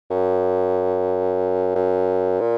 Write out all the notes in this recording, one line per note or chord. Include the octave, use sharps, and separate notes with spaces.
F#2
F#2
A#2